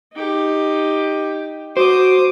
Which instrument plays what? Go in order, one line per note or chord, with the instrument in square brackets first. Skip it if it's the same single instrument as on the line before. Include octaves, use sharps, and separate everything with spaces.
[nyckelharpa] D#4 G4
[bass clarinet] F#4 [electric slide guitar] C5 [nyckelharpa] D6 D#6